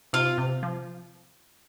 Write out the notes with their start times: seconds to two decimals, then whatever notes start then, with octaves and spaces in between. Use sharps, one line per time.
0.13 C3 F4
0.38 C3
0.63 F3